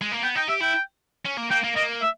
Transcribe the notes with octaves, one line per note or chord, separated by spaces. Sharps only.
G#3
A#3
B3 G5
D#4 G5
G4 E5
E4 G5
C#4
A#3
A#3 G5
A#3
A#3 D#5
E5